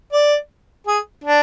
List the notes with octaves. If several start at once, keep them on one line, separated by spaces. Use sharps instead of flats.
D5
G#4
D4